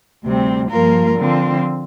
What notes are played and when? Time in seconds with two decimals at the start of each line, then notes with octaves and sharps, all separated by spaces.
0.24 D2 C3 G3 C4
0.70 G2 F3 A#3 F4 A#4
1.17 D3 F3 C4 F4